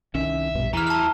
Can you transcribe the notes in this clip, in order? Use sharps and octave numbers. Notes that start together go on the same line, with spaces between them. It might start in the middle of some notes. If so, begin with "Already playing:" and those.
C2 D#3 C#4 E5
A#1 G2 B2
E2 E3 A#5 F6
A5 F6